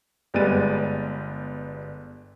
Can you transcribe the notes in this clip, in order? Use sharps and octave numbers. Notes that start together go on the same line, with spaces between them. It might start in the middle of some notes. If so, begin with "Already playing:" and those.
G1 G3 G#3 B3 A6 D#7